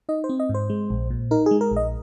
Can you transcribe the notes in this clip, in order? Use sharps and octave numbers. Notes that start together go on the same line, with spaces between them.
D#4 D#5
C5
C4
D#5
G#2
C5
G#3
A#1
A#2
D#4 A#4
G#3 G#4
A#4
A#1
D#5